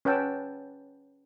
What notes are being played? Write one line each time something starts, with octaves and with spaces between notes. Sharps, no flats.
C#4 B4 F#5 G5 A5 E6